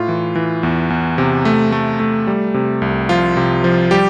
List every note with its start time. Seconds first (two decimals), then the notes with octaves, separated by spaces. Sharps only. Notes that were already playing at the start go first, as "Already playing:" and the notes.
Already playing: A2 F4
0.08 E3
0.35 E3
0.63 E2
0.90 E2
1.18 C3
1.45 A3
1.72 A3
2.00 A3
2.27 G3
2.54 C3
2.82 C2
3.09 F3 F4
3.37 C3
3.64 F3
3.91 G3 G4